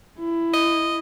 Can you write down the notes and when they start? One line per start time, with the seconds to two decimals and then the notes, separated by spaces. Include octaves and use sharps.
0.19 E4
0.53 D#5